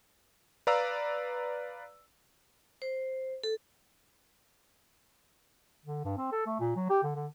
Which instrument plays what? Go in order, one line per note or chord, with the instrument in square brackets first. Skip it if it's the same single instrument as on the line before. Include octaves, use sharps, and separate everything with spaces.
[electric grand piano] B4 D5 F5 A#5 E6
[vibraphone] C5
A4
[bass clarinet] D3
G2
C4
A4
A3
A#2
F#3
G4
D3
D3